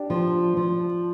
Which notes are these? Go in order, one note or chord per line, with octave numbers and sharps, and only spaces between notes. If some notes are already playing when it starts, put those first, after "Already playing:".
Already playing: D4 G4
F3
F3